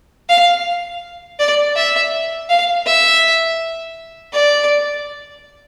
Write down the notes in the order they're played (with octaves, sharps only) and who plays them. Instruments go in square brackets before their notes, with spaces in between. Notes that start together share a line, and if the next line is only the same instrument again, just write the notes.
[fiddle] F5
D5
E5
F5
E5
D5